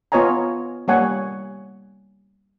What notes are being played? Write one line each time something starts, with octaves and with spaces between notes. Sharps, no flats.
B3 F4 C#5 D#5 G#5 A#5
G3 A#3 C#5 F#5 G#5